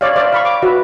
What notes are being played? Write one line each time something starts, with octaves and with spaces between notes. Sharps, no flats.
C#5 D5 E5 F5
C5 D5 E5 F5 D6
F5 B5 C#6
D6
F#4 B4 E5